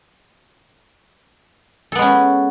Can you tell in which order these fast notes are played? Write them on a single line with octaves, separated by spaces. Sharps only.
A4 B3 G#3 C#4